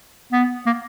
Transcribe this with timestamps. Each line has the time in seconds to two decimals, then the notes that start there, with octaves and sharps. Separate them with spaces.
0.32 B3
0.66 A#3